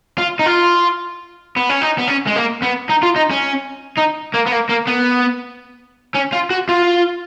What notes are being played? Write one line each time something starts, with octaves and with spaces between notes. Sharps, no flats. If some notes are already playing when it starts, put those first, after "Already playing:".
F4
D#4
F4
B3
C#4
D#4
B3
C#4
G#3
A#3
B3
D#4
F4
D#4
C#4
D#4
A#3
B3
A#3
A#3
B3
C#4
F4
F#4
F4